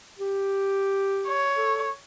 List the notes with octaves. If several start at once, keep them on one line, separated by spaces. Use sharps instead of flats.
G4
C#5
A4